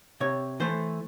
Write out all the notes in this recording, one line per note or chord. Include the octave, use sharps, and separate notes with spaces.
C3 C#5
E3 A3 C5